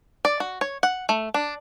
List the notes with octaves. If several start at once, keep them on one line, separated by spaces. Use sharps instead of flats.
D5
F#4
C#5
F#5
A3
D4